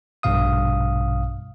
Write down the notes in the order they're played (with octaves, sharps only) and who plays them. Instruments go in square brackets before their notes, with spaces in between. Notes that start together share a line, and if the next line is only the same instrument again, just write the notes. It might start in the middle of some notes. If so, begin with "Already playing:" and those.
[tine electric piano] A#1 G2 B2 F5 D#6